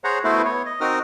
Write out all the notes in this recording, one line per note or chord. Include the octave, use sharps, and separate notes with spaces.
G#4 C5 C#5 F#5 A#5
A3 B3 E4 F#4 B4 C5
B3 C#5
D#5
C4 D#4 F#4 A#4 D#6 F6